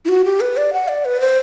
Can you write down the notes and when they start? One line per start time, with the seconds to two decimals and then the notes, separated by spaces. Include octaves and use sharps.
0.05 E4
0.09 F#4
0.25 G4
0.40 B4
0.57 D5
0.73 F#5
0.88 D5
1.05 B4
1.20 C5